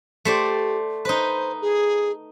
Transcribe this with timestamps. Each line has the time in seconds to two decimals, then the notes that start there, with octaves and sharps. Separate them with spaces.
0.25 A3 G4 C5 D5
1.05 D#4 B4 C5
1.61 G#4